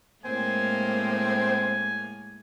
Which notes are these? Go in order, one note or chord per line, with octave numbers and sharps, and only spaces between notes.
A2 G#3 A#3 C4 G#5